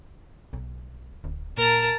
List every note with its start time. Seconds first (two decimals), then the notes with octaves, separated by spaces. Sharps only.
0.53 B1
1.24 D1
1.58 A#2 A#4 A5